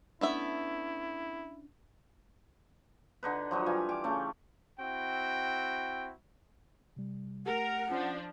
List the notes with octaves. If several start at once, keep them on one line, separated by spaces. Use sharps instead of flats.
A3 B3 C#4 D4 E4 E5
D3 D#4 B4
F3 F#3 D#4
E3 G3 F5 G#5
G4 D6
C#3 A3 C#4
C4 E4 F#4 G5
C3 G3
A3 G4 A#4 F#5
F3 C#4 D4